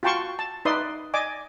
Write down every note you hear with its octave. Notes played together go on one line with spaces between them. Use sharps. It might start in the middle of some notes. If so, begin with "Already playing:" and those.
F4 F#4 G5 A5 C6 C#6
A5
D#4 B4 D5 E5 C6 D#6
D5 D#5 G#5 D6